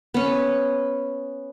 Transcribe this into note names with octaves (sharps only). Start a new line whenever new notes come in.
B3 C#4